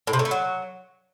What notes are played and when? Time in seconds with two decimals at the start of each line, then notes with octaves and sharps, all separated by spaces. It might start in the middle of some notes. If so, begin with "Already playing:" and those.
0.07 A2
0.13 C3
0.19 A2
0.25 A3
0.31 F#3